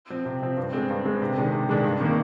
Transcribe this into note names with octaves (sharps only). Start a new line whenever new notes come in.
F3 C4
C3
F3 C4
G2
D3 G#3 C4
G2
D3 G#3 C4
C3
D#3 G#3 D4
C3
D#3 G#3 D4
G2
D#3 A#3